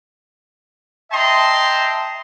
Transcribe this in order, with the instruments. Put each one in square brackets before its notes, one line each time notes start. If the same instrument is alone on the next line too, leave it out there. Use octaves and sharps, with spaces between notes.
[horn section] D#5 E5 G5 A5 A#5 C6